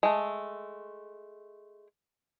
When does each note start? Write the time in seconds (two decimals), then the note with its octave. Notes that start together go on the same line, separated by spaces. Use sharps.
0.03 G#3 A3